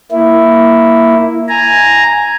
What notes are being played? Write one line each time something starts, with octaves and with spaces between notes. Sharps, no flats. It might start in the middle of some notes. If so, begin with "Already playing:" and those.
A#3 E4
G#5 A#5